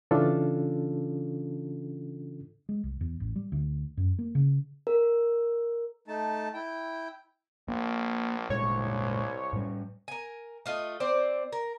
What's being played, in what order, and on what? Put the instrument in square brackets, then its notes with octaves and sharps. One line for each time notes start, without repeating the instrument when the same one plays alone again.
[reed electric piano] C#3 E3 C#4 D4 F4 A4
[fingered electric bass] G#3
C2
E2
A1
G3
D2
F#2
A#3
C#3
[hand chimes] A#4
[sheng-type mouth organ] A3 D#4 A5
E4 G5
[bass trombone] A#1 [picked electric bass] A#3
[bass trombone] C2 [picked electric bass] A#2 G3 G#3 [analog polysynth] C#5
[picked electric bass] A2 G3
[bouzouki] A#4 G#5
A3 F4 D#5
C4 C5 D5
A#4